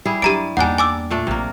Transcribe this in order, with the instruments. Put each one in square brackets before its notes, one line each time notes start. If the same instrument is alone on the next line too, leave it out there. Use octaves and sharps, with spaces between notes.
[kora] G3 E4 G#4
[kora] G2 E4 D5 [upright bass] F#3 [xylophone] G4 A#5 D7
[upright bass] E2 A#3 [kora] G3 D4 D#4 [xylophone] F#5 G#5
[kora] D5 [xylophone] G#5 D6 E6
[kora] A#2 A3 D4
[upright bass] A#1 F#2 [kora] C3 A#3